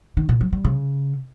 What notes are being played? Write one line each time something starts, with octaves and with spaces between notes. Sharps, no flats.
D#3
A#2
F#3
G3
C#3